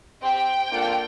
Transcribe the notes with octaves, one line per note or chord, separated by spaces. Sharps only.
C4 G4 G5
A#3 D4 F4 A4